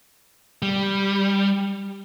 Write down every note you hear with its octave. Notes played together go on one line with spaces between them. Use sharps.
G3